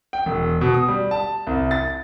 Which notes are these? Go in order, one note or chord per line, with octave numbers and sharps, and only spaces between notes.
G5
E1
B2
D#6
G3
A5
C2
A6